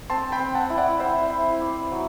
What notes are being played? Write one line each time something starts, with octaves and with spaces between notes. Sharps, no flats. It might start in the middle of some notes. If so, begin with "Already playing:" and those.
C4 A5 C6
G5 B5
C4
F#5 A5
E4
D5 F#5
E4 C5 E5
E4
D5
F#3